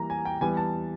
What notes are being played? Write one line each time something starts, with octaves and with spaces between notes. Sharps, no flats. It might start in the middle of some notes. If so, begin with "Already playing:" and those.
Already playing: E3 G3 A#3 A#5
G#5
G5
E3 G3 B3 G#5
A5